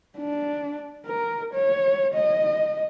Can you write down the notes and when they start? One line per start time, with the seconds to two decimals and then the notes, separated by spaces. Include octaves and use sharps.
0.18 D4
1.07 A#4
1.54 C#5
2.14 D#5